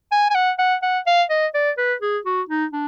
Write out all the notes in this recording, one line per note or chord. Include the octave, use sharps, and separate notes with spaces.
G#5
G#5
F#5
F#5
F#5
F5
D#5
D5
B4
G#4
F#4
D#4
D4